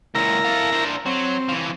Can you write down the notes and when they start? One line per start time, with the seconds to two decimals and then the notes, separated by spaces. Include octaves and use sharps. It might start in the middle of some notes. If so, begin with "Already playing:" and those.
0.15 C#2 A#2 E4 A#4 A#5
0.44 A4 F5
0.73 D4 C5
1.06 F#3 C4
1.49 E3 F3